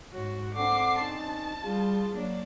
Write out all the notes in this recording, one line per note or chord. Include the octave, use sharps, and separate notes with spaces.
G#2 F#4 C#5
C4 D4 A4 F#5 D6 C7
C#4 D#4 A5
G3 F4 G#4
F#3 A#3 D4 D5